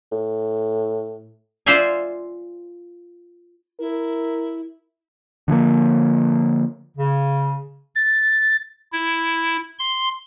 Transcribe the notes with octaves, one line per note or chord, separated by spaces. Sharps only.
A2
F4 C5 D5 E5 F5 G#5
E4 A#4
D3 F3 G#3 A#3
C#3
A6
E4
C6